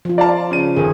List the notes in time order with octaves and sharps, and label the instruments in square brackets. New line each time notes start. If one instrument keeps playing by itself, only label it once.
[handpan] F3 F4
[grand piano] D5 F5 A5
C#3 D#7
[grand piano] G1 D#3 [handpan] G#4